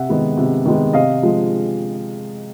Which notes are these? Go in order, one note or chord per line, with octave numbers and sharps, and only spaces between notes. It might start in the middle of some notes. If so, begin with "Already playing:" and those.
Already playing: C3 E5 F#5
D#3 G#3 B3
C3
D#3 G#3 B3
C3 D#5 F5
F3 G#3